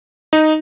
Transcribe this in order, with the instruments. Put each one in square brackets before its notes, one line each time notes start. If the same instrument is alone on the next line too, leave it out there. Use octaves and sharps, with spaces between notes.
[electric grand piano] D#4